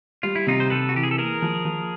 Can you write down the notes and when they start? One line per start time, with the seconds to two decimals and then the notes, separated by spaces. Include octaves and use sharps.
0.23 G3 F4
0.36 E4
0.47 C3 D#4 F4
0.60 C5
0.70 C3 A4 B4
0.89 F#4
0.95 E3 G4
1.03 G#4
1.11 A4
1.18 A#3 G#4 A#4
1.42 F3
1.65 F3